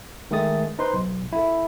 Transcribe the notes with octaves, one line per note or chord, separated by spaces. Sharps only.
D#3 G#3 A3 G#4 D#6 A6
D#4 B4 C5 C6
B1
E4 A4